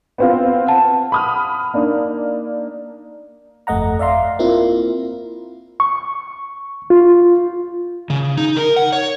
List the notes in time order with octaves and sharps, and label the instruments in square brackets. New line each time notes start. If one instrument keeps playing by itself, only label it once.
[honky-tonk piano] B3 C4 F4
[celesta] F#5 A5
[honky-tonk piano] B5 D#6 F6
A#3 D4 D#4
[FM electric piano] G1 F2 A3 D#5 F#5 A#5
D5 E5 F5 A#5 C6
A#3 C4 E4 F4
[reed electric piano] C#6
F4
[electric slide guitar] C#3
D#4
A#4
F#5
C#5